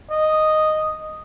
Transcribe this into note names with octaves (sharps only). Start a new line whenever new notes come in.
D#5